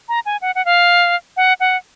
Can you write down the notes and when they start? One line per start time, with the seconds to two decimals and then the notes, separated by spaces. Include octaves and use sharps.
0.09 A#5
0.26 G#5
0.42 F#5
0.55 F#5
0.65 F5
1.37 F#5
1.60 F#5